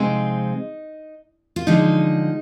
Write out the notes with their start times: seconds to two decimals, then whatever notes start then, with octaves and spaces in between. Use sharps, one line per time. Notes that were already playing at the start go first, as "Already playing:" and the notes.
Already playing: C3 F3 G#3 C4 D#4
1.56 F4
1.67 D3 F3 G#3 D#4